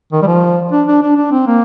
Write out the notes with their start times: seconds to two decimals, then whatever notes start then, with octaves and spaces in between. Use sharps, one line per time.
0.12 D#3
0.22 G3
0.27 F3
0.72 D4
0.88 D4
1.02 D4
1.17 D4
1.32 C4
1.47 A#3